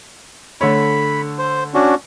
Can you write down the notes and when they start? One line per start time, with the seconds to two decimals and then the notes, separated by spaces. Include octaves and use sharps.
0.61 D3 A3 C#5 B5
1.39 C5
1.74 C#4 D4 F#4